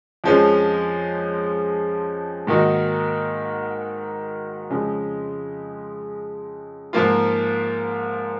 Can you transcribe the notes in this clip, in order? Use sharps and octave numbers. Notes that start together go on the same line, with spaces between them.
F2 F3 G#3 C#4 G#4
G#2 D#3 A#3 D#4 F#4
F2 C#3 G#3
G#2 F3 A#3 F4